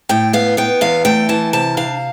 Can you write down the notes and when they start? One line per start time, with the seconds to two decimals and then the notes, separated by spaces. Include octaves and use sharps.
0.09 A2 G5
0.33 B3 F5
0.57 B3 G5
0.81 E2 F5
1.05 A3 G5
1.29 E3 A5
1.53 C3 A5
1.77 D4 F5